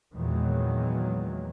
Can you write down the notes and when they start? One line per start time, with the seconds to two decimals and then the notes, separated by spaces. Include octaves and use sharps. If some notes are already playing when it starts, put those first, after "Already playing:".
0.14 E2 A#2 D#3 E3 F#3 G#3